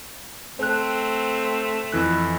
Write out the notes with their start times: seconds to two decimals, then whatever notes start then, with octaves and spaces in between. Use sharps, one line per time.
0.59 A3 C4 C5 F#6
1.92 F2 E3 F#6